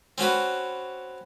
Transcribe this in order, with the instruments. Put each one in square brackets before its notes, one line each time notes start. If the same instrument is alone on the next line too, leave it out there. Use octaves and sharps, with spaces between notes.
[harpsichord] C4 C#4 F#4 B4